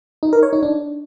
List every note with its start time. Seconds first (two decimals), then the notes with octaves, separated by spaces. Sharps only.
0.23 D#4
0.33 A#4
0.43 C#5
0.53 D#4
0.63 D4